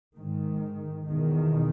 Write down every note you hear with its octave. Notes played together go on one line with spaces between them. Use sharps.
G#2 D#3
E2 B2 D#3